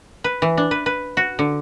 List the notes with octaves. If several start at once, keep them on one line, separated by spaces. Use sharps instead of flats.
B4
E3
D4
B4
B4
F#4
D3